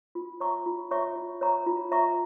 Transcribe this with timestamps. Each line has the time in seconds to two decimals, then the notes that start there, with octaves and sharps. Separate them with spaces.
0.15 F4
0.40 C#5 E5 A#5 C#6
0.66 F4
0.91 C#5 E5 A#5 C#6
1.16 F4
1.41 C#5 E5 A#5 C#6
1.66 F4
1.91 C#5 E5 A#5 C#6